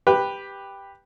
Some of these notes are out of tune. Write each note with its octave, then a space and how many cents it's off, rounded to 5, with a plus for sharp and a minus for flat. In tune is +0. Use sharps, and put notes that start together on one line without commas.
G4 +10 B4 +0